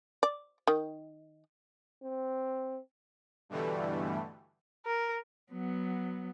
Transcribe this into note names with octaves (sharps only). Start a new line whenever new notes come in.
D5
D#3
C4
G2 B2 D3 E3 G3 A3
A#4
F#3 B3